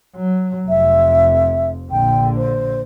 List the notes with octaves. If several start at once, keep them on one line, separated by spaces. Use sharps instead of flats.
F#3
F1 F2 E5
A#1 D3 G5
C5